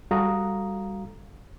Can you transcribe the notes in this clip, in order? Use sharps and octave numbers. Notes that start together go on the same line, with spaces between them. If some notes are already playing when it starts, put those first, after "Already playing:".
G3 F#4 A4 F5 A#5 D#6